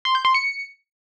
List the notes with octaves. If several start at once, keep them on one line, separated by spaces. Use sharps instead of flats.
C6
G6
C6
C#7